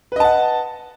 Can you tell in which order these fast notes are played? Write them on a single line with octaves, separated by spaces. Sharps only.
B4 D#5 A5 F#5